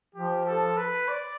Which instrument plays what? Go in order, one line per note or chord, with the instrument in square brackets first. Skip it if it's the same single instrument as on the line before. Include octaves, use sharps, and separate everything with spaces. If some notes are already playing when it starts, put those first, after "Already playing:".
[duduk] F3 [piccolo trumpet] G4
[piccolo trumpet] A4
B4
D5